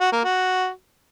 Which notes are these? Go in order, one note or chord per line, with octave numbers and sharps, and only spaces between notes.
F#4
A#3
F#4